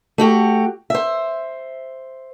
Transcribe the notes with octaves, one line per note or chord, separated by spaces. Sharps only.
A3 F#4 G4
C5 E5